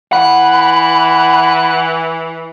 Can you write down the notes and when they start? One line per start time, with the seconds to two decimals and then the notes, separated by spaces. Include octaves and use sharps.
0.13 E3 F#5 B5
0.61 F#5